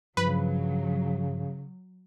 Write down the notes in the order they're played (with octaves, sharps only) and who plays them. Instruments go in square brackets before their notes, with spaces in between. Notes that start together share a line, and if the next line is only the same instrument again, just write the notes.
[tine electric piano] G2 F3 [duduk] C#3 [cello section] F#3 [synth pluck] B4